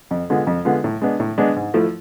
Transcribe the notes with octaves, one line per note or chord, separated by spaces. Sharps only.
F2
D3 G#3 B3 F4
F2
D3 G#3 B3 F4
A2
G#3 B3 D4
A2
G#3 B3 D4
G#2
F3 A3 E4